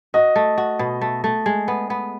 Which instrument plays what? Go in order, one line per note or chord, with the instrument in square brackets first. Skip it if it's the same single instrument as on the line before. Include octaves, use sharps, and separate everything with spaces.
[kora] F#4 [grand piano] D#5
[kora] A3
F#4
B2
A3
A3
G#3
B3
B3